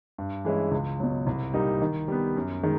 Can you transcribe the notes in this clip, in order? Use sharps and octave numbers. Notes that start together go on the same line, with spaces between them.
G2
E3 G#3 C#4 E4
C#2
B2 F#3
C2
A#2 G3 A#3 D#4
D#3
G3 B3
F#2
D#3 G#3